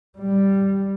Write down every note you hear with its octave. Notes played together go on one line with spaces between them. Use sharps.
G3